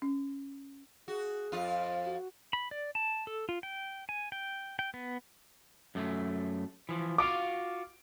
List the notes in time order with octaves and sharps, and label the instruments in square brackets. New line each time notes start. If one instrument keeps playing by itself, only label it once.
[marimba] C#4
[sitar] F#4 [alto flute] G#4
[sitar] F2 F4
[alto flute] F5
F#4
[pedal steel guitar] B5
D5
A5
A4
F4
G5
G#5
G5
G5
B3
[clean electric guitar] F#2 A3
E3 F3
[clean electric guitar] F4 F#4 F5 [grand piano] D6 D7